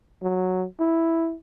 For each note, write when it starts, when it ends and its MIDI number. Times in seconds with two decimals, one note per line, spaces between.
0.22 0.66 54
0.80 1.35 64